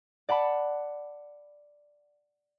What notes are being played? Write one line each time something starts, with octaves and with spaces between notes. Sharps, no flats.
D5 F#5 A5 B5